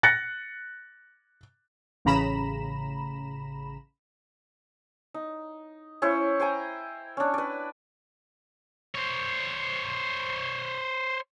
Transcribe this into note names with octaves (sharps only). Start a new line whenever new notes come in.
F#6 A6 A#6 C#7
A1 C#3 A#5 B5 E7
D#4
C#4 E4 C5 C#5
C5 G5 G#5 A#5
C#4 D4
B4 D5
C5 C#5